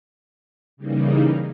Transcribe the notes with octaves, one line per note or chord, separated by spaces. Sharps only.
C#3 E3 G3 A#3 D#4